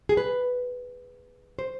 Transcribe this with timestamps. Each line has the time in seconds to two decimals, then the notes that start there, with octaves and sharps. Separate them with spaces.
0.09 G#4
0.17 B4
1.59 C5